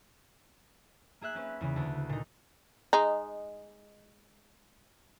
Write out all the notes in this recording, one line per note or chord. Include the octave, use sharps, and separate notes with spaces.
A#3 G#4 E5 F#6
C4 C#4 B4
E2 C#3
D2
A#2 D#4
G#3 D#4